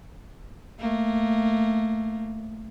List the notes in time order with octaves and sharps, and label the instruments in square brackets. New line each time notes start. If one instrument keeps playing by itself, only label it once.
[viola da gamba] A3 A#3